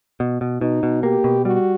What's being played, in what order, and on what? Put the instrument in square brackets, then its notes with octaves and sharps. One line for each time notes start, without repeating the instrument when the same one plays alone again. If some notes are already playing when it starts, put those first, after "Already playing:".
[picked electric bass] B2
B2
[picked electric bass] B2 [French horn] D#4
[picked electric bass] B2
[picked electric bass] A#3 [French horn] G4
[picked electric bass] B2
[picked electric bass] G3 [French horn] F#4